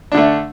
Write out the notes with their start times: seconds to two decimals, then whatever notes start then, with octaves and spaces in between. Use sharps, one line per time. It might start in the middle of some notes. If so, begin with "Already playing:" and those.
0.12 D4
0.14 D3
0.17 A3